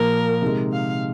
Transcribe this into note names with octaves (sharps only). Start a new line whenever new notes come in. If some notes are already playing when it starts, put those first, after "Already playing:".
Already playing: A#2 F3 A#3 A#4
C3 D#3 G#3
F5